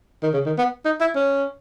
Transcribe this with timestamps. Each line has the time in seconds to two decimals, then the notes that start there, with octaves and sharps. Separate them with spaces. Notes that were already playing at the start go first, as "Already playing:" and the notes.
0.23 D#3
0.34 C#3
0.46 D#3
0.58 B3
0.85 D#4
1.00 E4
1.16 C#4